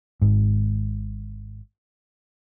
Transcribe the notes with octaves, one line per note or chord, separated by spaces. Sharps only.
G#1 G#2